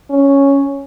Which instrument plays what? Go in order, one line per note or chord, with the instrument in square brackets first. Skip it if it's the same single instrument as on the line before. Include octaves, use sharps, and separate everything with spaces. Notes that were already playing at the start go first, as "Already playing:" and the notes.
[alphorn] C#4